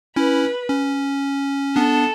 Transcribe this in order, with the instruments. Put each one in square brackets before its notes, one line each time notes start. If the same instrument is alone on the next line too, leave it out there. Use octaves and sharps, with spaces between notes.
[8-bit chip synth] C#4 E4 [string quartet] B4
[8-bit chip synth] C#4
[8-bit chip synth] B3 D4 [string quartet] A4